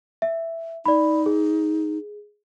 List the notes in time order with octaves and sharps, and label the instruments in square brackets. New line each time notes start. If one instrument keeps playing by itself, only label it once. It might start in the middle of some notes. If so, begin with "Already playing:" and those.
[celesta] E5
[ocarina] D#4 [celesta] D5 B5
[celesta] G#4